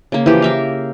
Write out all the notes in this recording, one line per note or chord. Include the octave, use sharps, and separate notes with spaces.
C#3 A#3
E3 F3 G4
A#4 E5 F5